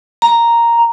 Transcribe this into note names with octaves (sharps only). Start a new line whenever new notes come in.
A#5